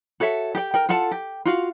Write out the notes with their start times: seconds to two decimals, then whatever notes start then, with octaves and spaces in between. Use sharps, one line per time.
0.20 F#4 A4 C#5 E5
0.55 G4 G5
0.74 A#4 G5
0.89 F4 A4 F#5 A5
1.11 G4
1.45 F4 F#4 F5